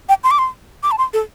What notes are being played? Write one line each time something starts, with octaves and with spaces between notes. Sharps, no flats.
G5
C6
D6
C6
D6
A5
C6
A4